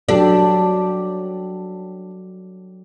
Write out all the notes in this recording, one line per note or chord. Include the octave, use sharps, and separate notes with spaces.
F#3 D4 G4 A4